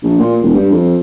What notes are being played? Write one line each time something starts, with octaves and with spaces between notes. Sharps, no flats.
A#1
A#2
E1
G2
F2